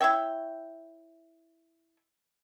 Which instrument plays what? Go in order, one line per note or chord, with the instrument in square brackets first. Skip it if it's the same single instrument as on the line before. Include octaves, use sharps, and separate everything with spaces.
[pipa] E4 C#5 E5 G5